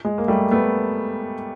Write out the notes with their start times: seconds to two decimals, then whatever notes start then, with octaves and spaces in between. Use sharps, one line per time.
0.05 G#3
0.18 A#3
0.28 G3 A3
0.51 A3 B3